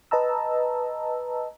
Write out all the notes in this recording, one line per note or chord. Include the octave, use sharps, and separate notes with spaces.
B4 D#5 A5 A#5 E6